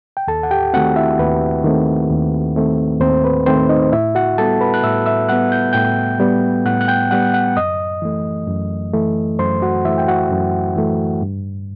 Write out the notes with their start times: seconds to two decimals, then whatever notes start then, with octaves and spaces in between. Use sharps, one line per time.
0.17 G5
0.27 D#2 A4 A5
0.43 F#5
0.51 G4 G5
0.73 D#3 A3 C4 F#4 F#5
0.96 E4 E5
1.19 D#2 B4
1.64 D#3 A3 C4
2.10 D#2
2.56 D#3 A3 C4
3.01 D#2 C4 C5
3.25 B4
3.46 D#3 A3 C4 C5
3.69 D#4 D#5
3.92 A2 E4 E5
4.15 F#4 F#5
4.38 G3 B3 A4 A5
4.61 B4 B5
4.74 F#6
4.83 A2 E5 E6
5.06 E5 E6
5.29 G3 B3 F#5 F#6
5.52 G6
5.73 A2 G5 G6
6.20 G3 B3
6.66 A2 F#5 F#6
6.81 F#6
6.88 G5 G6
7.11 G3 B3 F#5 F#6
7.34 F#5 F#6
7.56 F#2 D#5 D#6
8.02 E3 A3
8.48 F#2
8.93 E3 A3
9.39 F#2 C5 C6
9.62 F#4 F#5
9.85 E3 A3 E4 E5
9.98 G5
10.08 F#4 F#5
10.31 F#2
10.76 E3 A3
11.22 G2